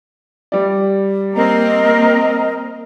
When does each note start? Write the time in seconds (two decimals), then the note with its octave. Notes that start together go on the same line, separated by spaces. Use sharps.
0.52 G3 D5
1.35 A#3 C4 A#4 D#5 A#5